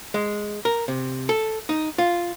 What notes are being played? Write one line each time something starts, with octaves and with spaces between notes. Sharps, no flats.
G#3
A#4
C3
A4
D#4
F4